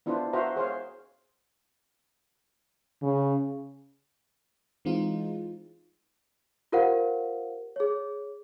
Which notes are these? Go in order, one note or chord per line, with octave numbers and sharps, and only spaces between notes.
B3 D4 E4 F4 B4 C5
F#4 B4 C5 E5 F5 A#5
G#4 C5 C#5 F5
C#3
E3 G#3 C4 D#4 F4
F4 G4 A#4 C5 F5 F#5
G#4 C#5